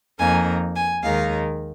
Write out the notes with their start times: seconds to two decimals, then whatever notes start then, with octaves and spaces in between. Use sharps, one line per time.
0.19 F2 F3 A#3 D#4 G#5
0.76 G#5
1.03 D#2 D#3 G#3 D#4 F5